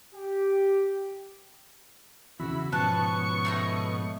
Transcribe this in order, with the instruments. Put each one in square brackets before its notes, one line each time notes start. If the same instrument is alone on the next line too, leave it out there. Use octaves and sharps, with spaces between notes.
[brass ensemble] G4
[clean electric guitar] E2 C#3 [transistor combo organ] E4 B5 [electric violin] F#4
[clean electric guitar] G#2 F3 C#4 [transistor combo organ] B2 [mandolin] A5 F#6 [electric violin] C#6 C#7
[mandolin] A3 G#4 D#5